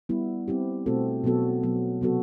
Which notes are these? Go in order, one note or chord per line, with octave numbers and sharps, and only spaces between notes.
G3 B3 E4
G3 C4 E4 G4
B2 A3 C4 F#4 A4
B2 F#3 B3 F#4 A4
B2 F#3 B3
C3 F#3 B3 F#4 A4